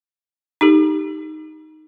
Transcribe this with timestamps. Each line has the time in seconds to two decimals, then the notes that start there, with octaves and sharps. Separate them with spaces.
0.61 D#4 G4 A4